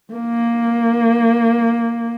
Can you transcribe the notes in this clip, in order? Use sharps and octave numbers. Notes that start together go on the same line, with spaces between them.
A#3